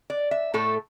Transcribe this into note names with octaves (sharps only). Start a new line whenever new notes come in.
D5
E5
A2 A3 A4